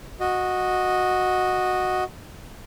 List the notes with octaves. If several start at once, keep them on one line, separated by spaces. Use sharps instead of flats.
F#4 D#5